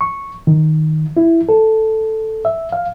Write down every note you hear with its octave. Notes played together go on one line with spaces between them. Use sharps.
C#6
D#3
E4
A4
E5
F5